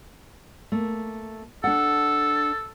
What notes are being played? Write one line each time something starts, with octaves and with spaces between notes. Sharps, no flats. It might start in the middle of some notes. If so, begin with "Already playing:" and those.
A3 A#3
D4 A4 F#5